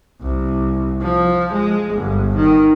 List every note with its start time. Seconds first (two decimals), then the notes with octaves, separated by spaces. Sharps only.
0.21 C2
1.02 F3
1.52 G#3
1.93 G1
2.36 D#3